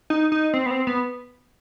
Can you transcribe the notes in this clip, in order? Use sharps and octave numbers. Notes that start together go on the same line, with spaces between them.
D#4
D#4
C4
B3
C4
B3